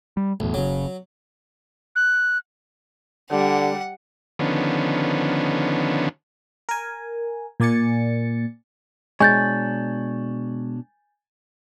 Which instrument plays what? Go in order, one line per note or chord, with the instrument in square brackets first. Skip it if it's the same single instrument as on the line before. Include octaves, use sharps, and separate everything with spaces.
[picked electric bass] G3
[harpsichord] B1 [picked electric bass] E2 A2
[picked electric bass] F#1 C#3 [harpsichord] F#3
[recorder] F#6
[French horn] D3 [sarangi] G3 [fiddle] F#5
[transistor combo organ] D3 D#3 F3 B3 C#4
[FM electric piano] A#4 G#5
A#2 A#3 D5 G#5 A6 C#7
[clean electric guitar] B2 D4 C#5 [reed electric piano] G#3 [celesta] G#5 G6 A6